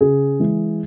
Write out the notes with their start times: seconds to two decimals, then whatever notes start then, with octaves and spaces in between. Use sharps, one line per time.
0.01 C#3 G#4
0.40 E3 G#3